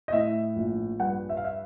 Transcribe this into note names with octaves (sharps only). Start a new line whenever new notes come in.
D#5
A2 E5
A#1
G2 F#5
E5
F5
E5